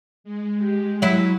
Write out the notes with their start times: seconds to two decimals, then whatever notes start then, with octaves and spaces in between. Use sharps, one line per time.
0.24 G#3
0.61 G4
1.02 F#3 E4